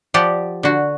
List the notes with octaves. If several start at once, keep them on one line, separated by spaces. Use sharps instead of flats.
F3 G4 D5 F#5
D3 F#4